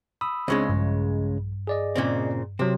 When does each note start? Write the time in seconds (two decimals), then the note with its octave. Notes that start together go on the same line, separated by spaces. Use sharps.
0.21 B5 D#6 E6
0.48 C#2 C#3 G#3 C4 D4
0.69 A#1 G2
1.67 G#4 D5 D#5
1.96 A#2 C#3 C4
2.59 C3 F#3 C4